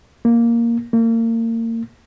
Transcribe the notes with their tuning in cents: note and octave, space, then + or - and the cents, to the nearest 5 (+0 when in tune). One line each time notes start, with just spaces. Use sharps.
A#3 +0
A#3 -35